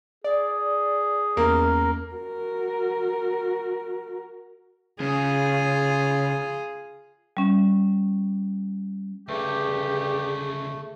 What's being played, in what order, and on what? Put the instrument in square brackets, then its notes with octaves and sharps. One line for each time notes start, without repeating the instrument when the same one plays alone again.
[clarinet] G#4 [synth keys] D5
[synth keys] E2 C#4 [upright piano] A#3 [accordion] A#4
[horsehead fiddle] F#4 A#4
[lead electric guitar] C#3 [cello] F4 G#4
[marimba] G3 C#4
[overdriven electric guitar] D2 C#3 [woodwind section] G2 G4 [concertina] A3 [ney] G#4